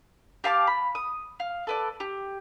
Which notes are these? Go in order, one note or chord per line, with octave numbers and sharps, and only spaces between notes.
G4 F5 A5 D6
B5
D#6
F5
A4 B4 D5
G4